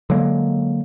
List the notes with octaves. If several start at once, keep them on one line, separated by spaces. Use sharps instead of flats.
D3 F#3 G#3 A#3